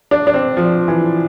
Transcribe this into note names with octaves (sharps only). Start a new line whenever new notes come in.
D4
D4
C4
F3
E3